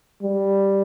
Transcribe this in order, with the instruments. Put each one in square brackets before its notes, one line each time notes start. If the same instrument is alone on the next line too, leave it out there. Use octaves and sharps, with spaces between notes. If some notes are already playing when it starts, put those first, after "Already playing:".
[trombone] G3